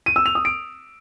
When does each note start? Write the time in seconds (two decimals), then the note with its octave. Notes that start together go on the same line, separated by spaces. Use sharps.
0.06 D#7
0.16 E6
0.26 F7
0.35 D#6
0.45 D7